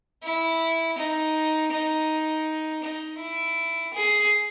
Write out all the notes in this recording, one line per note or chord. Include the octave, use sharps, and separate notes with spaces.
E4
D#4
D#4
D#4
E4
G#4